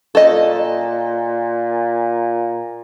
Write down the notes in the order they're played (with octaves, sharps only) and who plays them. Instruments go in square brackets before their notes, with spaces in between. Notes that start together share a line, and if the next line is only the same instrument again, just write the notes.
[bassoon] A#2 [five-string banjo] A4 D#5